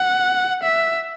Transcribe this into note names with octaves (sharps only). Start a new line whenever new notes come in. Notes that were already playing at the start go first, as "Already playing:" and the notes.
Already playing: F#5
E5